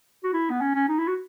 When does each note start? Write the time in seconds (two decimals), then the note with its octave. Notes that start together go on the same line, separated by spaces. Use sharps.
0.24 F#4
0.33 E4
0.50 B3
0.61 C#4
0.75 C#4
0.89 D#4
0.99 E4
1.07 F#4